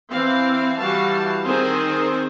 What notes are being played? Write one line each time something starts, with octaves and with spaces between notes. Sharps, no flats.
E3 C4 F5
E3 G3 F#4 F5 A5
D#3 C4 G#4 C5